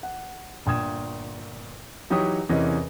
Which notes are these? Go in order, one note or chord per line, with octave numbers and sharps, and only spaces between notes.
F#5
G1 A#2 G5 D#6 G#6 E7
E3 F#3 D#4 G4 C#5 D#6
E2 C3 E3 C#4 A#4 D#5